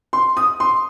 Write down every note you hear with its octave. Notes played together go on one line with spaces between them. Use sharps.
C6
D#6
C6